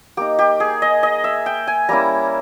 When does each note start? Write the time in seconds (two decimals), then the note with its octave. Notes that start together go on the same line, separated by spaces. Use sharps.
0.17 A#3 D#4 G4
0.39 G4
0.60 G#4
0.82 D#5
1.03 D#5
1.24 E5
1.46 G5
1.67 G#5
1.89 G3 A#3 C#4 E4 A#5